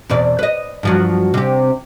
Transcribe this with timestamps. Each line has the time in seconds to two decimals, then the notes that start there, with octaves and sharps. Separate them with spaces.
0.10 E2 B2 D5
0.39 B4 D#5
0.83 G2 F3 F#3
1.34 C3 G4